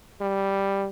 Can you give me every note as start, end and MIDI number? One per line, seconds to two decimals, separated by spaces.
0.21 0.87 55